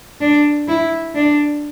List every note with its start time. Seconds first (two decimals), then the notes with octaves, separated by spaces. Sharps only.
0.20 D4
0.68 E4
1.15 D4